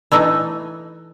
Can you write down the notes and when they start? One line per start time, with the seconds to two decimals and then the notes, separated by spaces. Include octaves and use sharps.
0.12 E3 A3 D#4